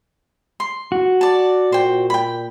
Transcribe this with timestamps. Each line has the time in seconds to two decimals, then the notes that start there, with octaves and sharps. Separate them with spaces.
0.60 C6
0.92 F#4
1.21 D5 A5
1.72 A#2 C5 G5
2.10 G5 B5